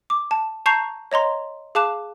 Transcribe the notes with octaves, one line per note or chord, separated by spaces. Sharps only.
D6
A5
A5 A#5 C#6 G6 C7 F7
C#5 D#5 A#5 C6
G#4 F5 A5 D6 F#6 E7